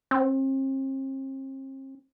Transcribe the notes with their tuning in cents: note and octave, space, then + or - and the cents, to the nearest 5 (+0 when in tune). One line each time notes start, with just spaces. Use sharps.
C4 +40